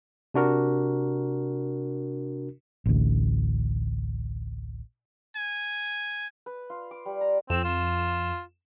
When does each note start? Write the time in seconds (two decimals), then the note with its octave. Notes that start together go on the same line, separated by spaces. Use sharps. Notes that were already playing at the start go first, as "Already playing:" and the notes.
0.34 C3 D4 F#4 A#4
2.86 A1 D2
5.36 G#5
6.46 B4
6.70 F4
6.91 D6
7.05 G3
7.21 A#5
7.50 F2 C4 E7
7.65 F4